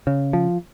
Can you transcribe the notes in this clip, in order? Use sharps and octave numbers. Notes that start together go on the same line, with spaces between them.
C#3
F3